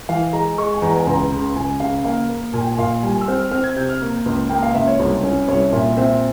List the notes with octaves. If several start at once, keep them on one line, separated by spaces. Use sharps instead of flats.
E3 F5
G#3 A#5
G#3 C#6
G#5
E2 A#5
G#5
C#2 A#5
C#3
C#2 G#5
C#3 F5
A#3 F5
A#3
A#2 G#5
G5
G#5
A#2 F5
G3 G#5
G#5
E6
C4 F6
F6
C4 F6
G#6
C3 G6
F6
A#3
C#2
A#3 G5
F5
C#2 E5
C#5
C2
C#4
C2 C#5
A#2 E5
C4 E5